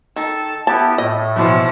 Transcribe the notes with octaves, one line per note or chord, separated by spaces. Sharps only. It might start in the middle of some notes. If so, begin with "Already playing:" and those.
D#3 A4 A5
B3 E4 G4 A5
A2 D#5
B2 E3 F3